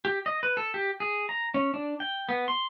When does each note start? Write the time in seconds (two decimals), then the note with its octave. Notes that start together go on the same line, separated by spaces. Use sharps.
0.05 G4
0.26 D#5
0.43 B4
0.57 A4
0.74 G4
1.00 G#4
1.29 A#5
1.54 C#4
1.74 D4
2.00 G5
2.29 B3
2.48 C6